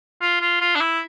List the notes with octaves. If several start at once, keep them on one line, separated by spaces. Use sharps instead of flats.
F4
F4
F4
D4
E4